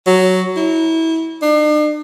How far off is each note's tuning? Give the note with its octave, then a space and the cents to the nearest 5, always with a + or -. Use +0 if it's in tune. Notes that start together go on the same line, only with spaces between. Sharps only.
F#3 +5
E4 -25
D4 +45